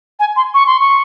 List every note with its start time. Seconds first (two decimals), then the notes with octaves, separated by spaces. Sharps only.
0.19 G#5
0.36 C6
0.54 C#6
0.67 C6
0.80 C#6